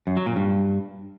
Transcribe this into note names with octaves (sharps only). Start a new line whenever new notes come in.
F#2
F#3
A#2
G2